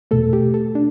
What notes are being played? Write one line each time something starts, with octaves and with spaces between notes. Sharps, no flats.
E2 B2 A3 A4
G4
A4
D4